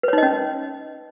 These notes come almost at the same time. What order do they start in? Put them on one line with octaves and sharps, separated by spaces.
B4 C#5 D#4 D#5 C#4